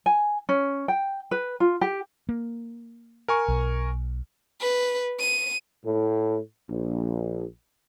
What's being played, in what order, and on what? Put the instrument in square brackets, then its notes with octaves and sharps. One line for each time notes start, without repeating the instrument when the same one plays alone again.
[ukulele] G#5
C#4
G5
B4
F4
G4
[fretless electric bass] A#3
[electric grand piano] A#4 G#5 C#6
[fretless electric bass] B1
[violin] B4
D#7
[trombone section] A2
A#1